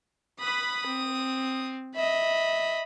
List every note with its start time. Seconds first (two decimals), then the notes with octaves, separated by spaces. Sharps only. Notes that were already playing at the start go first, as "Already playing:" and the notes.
0.40 B4 B5 D#6
0.86 C4
1.95 D#5 E5 B5